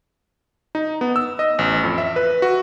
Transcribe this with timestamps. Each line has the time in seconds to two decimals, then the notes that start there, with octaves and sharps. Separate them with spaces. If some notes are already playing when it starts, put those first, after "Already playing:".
0.75 D#4
1.01 B3
1.16 E6
1.39 D#5
1.59 A1
1.84 F2
1.98 E5
2.16 B4
2.42 F#4